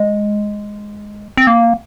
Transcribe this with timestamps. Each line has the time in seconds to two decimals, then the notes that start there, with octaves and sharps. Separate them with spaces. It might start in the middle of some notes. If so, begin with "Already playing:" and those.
Already playing: G#3
1.37 C4
1.47 A#3